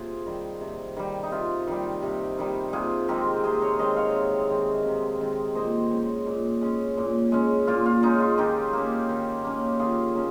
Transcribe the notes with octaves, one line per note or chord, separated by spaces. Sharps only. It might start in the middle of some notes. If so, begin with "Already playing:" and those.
Already playing: C3 F4 G#4
D#3 G3
C3
D#3 G3
D#4
C3 F4
D#3 G3
C3
D#3 G3
C3 F4 G#4
D#3 G#3 C4 G4 A#4
C3 G#4 C5
A#4 C#5
D#3 G#3 C4 C5 D#5
C#5 F5
C3
D#3 G#3 C4
C3
D#3 G#3 C4
A#2 C5 D#5
G#3 C#4
A#2
G#3 C#4
A#2
G#3 C#4
A#2 F4
F4
G#3 C#4 D#4
F4
D#3 D#4 G4
A#3 C#4
D#3
A#3 C#4
D#3 F4 G#4
A#3 C#4